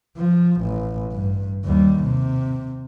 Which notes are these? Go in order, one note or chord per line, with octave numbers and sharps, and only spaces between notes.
F3
A1
G2
D#2 G3
C3